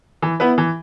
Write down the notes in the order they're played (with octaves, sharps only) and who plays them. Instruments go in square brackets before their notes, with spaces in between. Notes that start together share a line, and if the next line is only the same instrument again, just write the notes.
[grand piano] E3
B3 E4 B4
E3